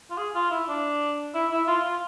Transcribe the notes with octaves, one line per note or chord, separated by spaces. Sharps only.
F4
G#4
F4
E4
D4
E4
E4
F4
F4